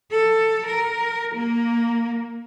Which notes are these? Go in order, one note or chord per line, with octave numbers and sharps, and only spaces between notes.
A4
A#4
A#3